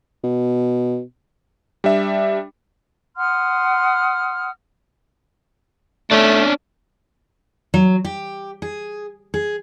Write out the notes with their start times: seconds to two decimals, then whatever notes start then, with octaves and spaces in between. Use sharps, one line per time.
0.24 B2
1.84 G3 D4 E5
3.17 F#5 C6 D#6 F6
6.11 A3 C#4 D4
7.74 F#3
8.05 G4
8.62 G#4
9.34 G#4